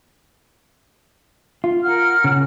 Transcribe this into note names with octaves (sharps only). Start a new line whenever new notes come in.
F4
A#4 F#5 F6
C#3